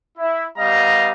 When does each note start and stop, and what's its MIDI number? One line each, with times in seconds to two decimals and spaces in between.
0.18 0.46 64
0.58 1.12 55
0.58 1.12 59
0.58 1.12 75
0.58 1.12 77
0.58 1.12 82